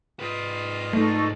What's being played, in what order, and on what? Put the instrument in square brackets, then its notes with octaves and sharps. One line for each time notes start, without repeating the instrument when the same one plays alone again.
[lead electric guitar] G#2 B4 [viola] F4 D#5
[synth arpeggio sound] A3 [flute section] D#4 A4 C#6